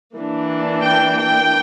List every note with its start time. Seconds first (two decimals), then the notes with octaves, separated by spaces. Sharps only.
0.16 E3 A#3 D4
0.83 G5
1.17 G5